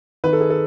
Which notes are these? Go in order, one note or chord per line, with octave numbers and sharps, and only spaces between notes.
D#3 B4
A4
G#4
A4